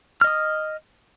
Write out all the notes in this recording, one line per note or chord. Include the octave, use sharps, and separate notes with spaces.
D#5 D#6 F6